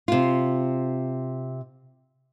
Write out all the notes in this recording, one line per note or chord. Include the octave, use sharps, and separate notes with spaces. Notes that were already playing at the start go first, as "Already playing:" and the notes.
C3 F4